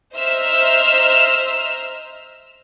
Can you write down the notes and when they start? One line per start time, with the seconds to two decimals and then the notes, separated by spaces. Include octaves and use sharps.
0.15 C5 D#5 E5 A#5 E6 F6